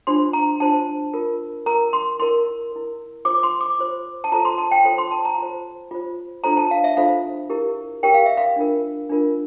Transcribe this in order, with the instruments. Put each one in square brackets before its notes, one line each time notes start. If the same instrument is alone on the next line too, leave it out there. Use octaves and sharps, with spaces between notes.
[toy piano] D4 F4 C5 C6
A#5
D4 F4 C5 A5
F4 A#4
F4 A#4 A#5
C6
E4 A#4 C6
E4 A#4
F4 C5 D6
C6
D6
F4 C5
A5
F4 A4 C5 A#5
C6
A5
G5
F4 A4 C5
C6
A5
A#5
F4 C5
F4 C5
D4 F4 A4 C5 A#5
A5
F5
E5
D4 F4 A4 C5 F5
E4 G4 A#4
E4 G4 A#4 G5
F5
E5
F5
D4 F4 A#4
D4 F4 A#4